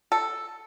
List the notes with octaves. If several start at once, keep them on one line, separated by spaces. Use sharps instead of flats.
A4